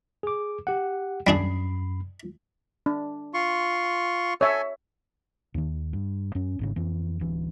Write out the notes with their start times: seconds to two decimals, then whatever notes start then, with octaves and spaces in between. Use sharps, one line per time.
0.23 G#4 D6
0.67 G4 F#5
1.27 F#2 G3 D4 G#4 B5 C7
2.86 D4
3.34 F4 C6 C#6
4.41 A4 C#5 E5 G#5
5.54 D#2 D#3
5.93 G2
6.35 F#2 C#4
6.59 G#1 G#2 C#3
6.76 F2 E3
7.20 D1 E3